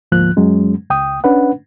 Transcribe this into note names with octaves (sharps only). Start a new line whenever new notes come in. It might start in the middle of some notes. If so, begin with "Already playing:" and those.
D2 G#2 F3 A#3 F#6
F#2 F#3 G#3 C#4
C#2 G5 D#6
C#4 D4 B4 F#5